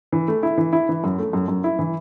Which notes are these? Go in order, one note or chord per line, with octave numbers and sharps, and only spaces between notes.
E3
A3
E4
E3
E4
E3
F#2
A3
F#2
F#2
E4
E3